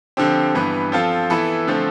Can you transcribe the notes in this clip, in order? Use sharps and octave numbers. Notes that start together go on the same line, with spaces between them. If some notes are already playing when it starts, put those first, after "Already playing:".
D3 F3 C4 G4
G2 E3 B3
F3 C4 F4 A4
E3 B3 E4 A4
D3 F3 A3 C4